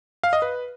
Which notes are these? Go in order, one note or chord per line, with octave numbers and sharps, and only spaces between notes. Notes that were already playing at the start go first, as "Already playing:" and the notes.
F5
D#5
B4